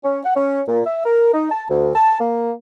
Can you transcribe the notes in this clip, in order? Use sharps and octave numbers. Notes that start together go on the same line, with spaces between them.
C#4
F#5
C#4
A#2
E5
A#4
D#4
A5
D2
A5
A#3